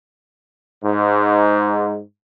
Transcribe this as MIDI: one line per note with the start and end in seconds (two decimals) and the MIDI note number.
0.84 1.97 44